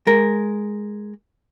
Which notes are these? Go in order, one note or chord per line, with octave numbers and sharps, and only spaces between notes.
G#3 A#4